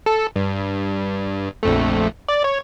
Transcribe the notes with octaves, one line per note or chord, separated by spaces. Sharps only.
A4
G2
A#1 F2 A3
D5
C#5